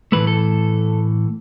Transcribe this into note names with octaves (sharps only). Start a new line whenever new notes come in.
A2 E3 A3 B4
A4